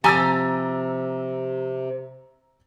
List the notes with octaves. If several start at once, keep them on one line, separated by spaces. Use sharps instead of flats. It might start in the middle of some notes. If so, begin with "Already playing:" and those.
C3 F3 G4 G#5 A#5 E6 A6